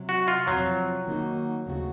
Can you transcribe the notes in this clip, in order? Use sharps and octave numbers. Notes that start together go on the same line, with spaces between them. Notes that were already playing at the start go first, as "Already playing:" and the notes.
Already playing: C3 F#3
F#4
F4
F2 C3 F3 F#3 C4
D#3 A#3 D#4 F#4
D#2 C#3 A3 C4 F#4